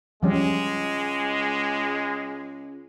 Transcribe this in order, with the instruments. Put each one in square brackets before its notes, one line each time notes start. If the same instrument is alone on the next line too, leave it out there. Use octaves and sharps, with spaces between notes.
[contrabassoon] C#2 [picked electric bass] F3 G3 C#4 [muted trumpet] G#3